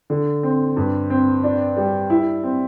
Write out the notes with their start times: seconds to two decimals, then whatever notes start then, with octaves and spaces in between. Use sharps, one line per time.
0.10 D3
0.43 C4
0.77 G2
1.10 C4
1.44 D4
1.77 G3
2.10 E4
2.43 C4